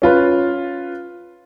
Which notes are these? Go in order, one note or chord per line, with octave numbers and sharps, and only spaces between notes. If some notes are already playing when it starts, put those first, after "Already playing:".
C#4 F4 B4